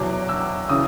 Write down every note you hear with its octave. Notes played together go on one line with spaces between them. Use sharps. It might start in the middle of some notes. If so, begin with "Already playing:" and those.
Already playing: E2 B2 F#3 D6
E6
C#3 E3 D#6